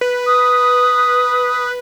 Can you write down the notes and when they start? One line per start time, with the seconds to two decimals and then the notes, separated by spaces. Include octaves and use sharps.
0.01 B4
0.26 D#6